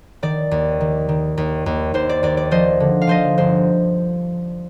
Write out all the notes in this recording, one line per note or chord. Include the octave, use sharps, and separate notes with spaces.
D#3 D5
D#2
D#3
D#3
D#2
D#2
D#2 C5
D5
D#2 D5
D5
F3 C5 D#5
D3
F5
F3 C5 D#5
G1 C5